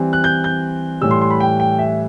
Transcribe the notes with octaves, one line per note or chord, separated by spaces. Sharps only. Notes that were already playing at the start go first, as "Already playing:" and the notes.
Already playing: E3 G3 C4
F#6
G6
G6
A2 E3 G3 E6
C6
C6
B5
G5
G5
E5